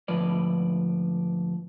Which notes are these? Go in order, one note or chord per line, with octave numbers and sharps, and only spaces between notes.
D2 G#2 F3 B4 D5